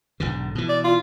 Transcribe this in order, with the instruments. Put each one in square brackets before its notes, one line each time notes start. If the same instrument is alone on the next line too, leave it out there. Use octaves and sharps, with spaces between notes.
[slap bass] B1 G#2 D3
B2 E3
[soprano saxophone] D5
F4